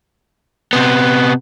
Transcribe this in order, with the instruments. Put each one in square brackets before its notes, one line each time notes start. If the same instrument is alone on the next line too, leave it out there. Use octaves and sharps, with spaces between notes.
[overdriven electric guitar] C3 B3